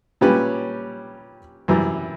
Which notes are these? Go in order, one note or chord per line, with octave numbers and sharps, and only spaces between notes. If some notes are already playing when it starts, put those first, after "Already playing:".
A#2 G3 C#4 G4 B4
F#2 E3 G3